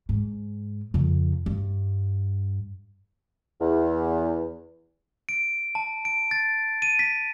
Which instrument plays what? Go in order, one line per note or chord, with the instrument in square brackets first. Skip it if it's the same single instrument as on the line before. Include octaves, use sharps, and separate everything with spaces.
[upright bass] G#2
F2 C#3
G2
[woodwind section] E2
[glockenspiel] D7
A5
D7
A6
D#7
B6